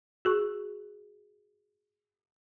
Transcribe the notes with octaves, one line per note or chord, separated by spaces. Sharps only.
F#4 G#4 C#6